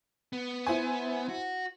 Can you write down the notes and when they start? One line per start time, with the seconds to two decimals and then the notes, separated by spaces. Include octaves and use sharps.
0.33 B3
0.67 E4 C5 G#5
1.29 F#4